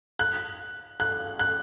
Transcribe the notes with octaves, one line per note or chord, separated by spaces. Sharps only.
F#6
F#6
F#6